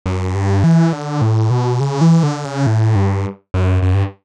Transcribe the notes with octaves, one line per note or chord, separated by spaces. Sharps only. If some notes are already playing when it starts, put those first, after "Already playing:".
F#2
G2
E3
D3
A2
B2
C#3
E3
D3
C#3
A2
G2
F#2
F#2
G2